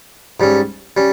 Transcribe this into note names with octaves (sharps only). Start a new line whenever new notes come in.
G#2 G3 C#4
G3 C#4